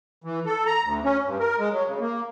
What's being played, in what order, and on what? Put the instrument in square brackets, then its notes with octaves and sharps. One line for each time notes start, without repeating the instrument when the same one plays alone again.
[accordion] E3
A4
A#5
D2
C#4
G2
A#4
G#3
F#3
C#3
A#3